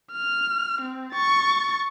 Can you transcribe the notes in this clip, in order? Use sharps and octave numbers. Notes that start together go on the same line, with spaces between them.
F6
C4
C#6 A6